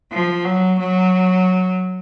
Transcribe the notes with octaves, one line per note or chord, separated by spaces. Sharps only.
F3
F#3
F#3